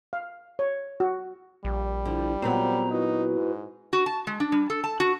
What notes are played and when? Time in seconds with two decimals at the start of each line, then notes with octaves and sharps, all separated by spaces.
0.13 F5
0.59 C#5
1.00 F#4
1.65 A#1 G3
2.05 D3 F3 E4
2.42 A#2 F#3 B3 C4 C5 A#5
2.90 D#4 E4 F#4 B4
3.36 G#2
3.93 F#4
4.06 A5
4.27 G#3
4.40 D4
4.52 G3
4.70 A4
4.84 A5
5.00 F#4